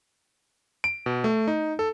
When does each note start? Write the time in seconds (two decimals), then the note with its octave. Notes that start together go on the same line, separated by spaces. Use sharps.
0.84 D7
1.06 B2
1.24 A3
1.48 D#4
1.79 A4